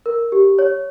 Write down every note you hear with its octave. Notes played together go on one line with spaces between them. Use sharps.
A#4
G4
C#5